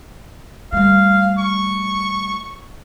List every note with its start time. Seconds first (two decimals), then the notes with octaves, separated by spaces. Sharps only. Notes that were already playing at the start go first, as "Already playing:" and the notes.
0.72 G3 A3 F5
1.38 C#6